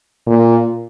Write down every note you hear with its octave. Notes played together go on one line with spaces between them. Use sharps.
A#2